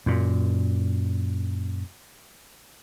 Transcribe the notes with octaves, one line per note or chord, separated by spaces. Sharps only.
F#2 A#2